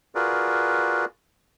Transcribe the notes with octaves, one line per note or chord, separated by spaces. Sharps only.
F4 F#4 G#4 A#4 B4 D5